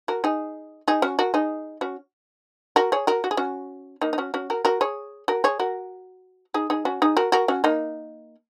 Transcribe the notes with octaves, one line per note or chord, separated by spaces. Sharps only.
F#4 A#4
D#4 G#4
D#4 G#4
C#4 F#4
F#4 A#4
D#4 G#4
C#4 F#4
F#4 A#4
G#4 C#5
F#4 A#4
F#4
G#4
C#4 F#4
A#3 D#4
D#4
C#4 F#4
C#4 F#4
F#4 A#4
F#4 A#4
G#4 C#5
F#4 A#4
G#4 C#5
F#4 A#4
D#4 G#4
D#4 G#4
C#4 F#4
D#4 G#4
F#4 A#4
F#4 A#4
C#4 F#4
A#3 D#4